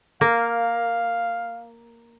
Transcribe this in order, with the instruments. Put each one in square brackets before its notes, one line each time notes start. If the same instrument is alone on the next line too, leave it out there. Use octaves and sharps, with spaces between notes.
[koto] A#3 [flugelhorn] F5